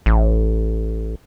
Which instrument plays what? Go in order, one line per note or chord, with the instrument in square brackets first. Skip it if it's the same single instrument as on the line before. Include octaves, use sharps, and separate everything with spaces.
[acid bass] A1